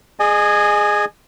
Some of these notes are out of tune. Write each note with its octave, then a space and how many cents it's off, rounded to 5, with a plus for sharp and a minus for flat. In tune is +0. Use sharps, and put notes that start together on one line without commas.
G#4 +0 D#5 -35 G#5 +0